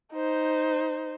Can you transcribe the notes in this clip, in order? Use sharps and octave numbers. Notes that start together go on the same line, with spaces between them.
D#4 C5